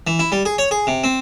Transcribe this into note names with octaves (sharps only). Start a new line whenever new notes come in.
E3
E4
G3
G#4
C#5
G#4
C3
C4